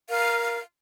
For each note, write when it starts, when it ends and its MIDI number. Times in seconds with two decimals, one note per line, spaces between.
0.10 0.60 70
0.10 0.60 77